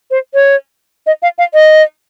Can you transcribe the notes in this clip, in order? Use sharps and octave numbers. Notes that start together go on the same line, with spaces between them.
C5
C#5
D#5
F5
F5
D#5